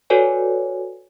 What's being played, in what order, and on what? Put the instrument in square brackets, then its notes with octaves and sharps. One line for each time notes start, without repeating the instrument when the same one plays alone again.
[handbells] F#4 A4 B4 C#5 D5 G#5